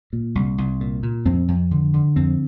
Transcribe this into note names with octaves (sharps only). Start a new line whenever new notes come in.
A#2
C2
C2
A#2
A#2
F2 C4
F2
D3
D3
F2 C4